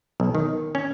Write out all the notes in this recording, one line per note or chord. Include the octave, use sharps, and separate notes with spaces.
B1
D#3
C#4